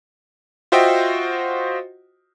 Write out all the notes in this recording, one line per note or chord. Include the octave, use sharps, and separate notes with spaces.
F4 F#4 C5 D#5 E5 G5